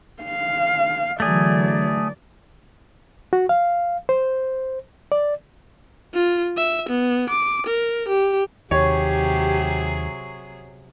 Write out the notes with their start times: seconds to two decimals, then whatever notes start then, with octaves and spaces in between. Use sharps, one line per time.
0.23 F5
1.20 D3 E3 F#3 A3 G#4 D5
3.33 F#4
3.49 F5
4.09 C5
5.12 D5
6.14 F4
6.57 E5
6.89 B3
7.30 D6
7.67 A#4
8.09 G4
8.71 D#2 C3 F#3 G4 G#4 C#5